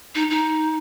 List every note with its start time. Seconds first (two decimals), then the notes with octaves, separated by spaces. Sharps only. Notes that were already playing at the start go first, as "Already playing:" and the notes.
0.15 D#4
0.30 D#4